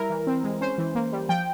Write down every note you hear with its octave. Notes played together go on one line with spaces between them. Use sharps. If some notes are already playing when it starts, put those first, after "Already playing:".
Already playing: G3 E4 A#4
E3
C4
G#3
C#4 C5
E3
A#3
G3
F3 G5